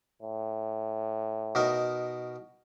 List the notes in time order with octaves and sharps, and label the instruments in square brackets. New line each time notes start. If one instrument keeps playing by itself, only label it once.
[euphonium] A2
[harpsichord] B2 D#4 A#4